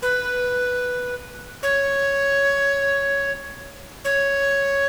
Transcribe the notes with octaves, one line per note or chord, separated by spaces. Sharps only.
B4
C#5
C#5